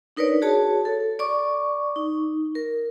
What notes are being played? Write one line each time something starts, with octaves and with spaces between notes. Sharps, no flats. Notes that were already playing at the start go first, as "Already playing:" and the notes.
D4 D#4 A#4 B4 C#5 D5
F#4 G#4 C#5 A5
A4
D5 C#6 D6
D#4
A#4